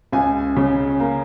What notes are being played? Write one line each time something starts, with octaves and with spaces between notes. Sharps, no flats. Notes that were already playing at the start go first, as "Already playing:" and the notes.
C#2 G#5
C#3
A#3